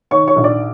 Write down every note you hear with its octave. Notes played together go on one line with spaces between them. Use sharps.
D#3 C#5 C#6
C#5 C#6
A#1
D5 D6